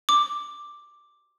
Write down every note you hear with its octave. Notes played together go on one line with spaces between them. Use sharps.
D6